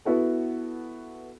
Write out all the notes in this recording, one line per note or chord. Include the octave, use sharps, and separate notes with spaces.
B3 E4 F#4 A4